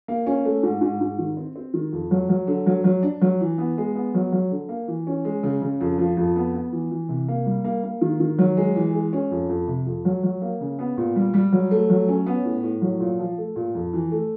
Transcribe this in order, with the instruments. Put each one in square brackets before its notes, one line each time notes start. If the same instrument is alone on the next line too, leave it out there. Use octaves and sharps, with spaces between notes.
[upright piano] A#3
C#4
A3
G#2
G#2
G#2
D#3
C4
C4
D#3
F2
F#3
F#3
D3
F#3
F#3
D4
F#3
E3
B3
G#3
B3
F#3
F#3
D3
A#3
E3
C#4
G#3
C#3
C#3
F2
F3
F2
B3
B3
E3
E3
C3
A#3
G3
A#3
A#3
D#3
D#3
F#3
G#3
E3
G#3
C#4
F2
F2
C3
F2
F#3
F#3
A#3
C#3
B3
A#2
G3
G3
F#3
A3
F#3
C#4
B3
A2
A2
F#3
A#2
F3
A3
A#2
F2
E3
A3